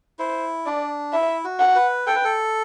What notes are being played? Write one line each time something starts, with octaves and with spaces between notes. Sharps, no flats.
E4 C5
D4 D5
E4 E5
F#4
F#5
B4
A4 G5
B4
A4